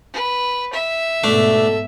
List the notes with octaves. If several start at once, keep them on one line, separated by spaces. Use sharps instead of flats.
B4
E5
G#2 B2 A3 D4 A4